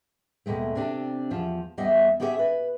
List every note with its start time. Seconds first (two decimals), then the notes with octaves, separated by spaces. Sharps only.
0.46 D#2 B2 G#3 A3
0.75 C3 C4 D4 E4 G4
1.30 E2 F3
1.78 E2 G3 B3 D#5 E5
2.20 B3 C#4 G4 G#4 D5 E5
2.39 B4